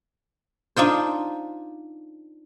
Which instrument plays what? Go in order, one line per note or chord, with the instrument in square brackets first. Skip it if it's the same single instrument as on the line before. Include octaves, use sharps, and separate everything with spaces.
[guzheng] D4 D#4 F4 C5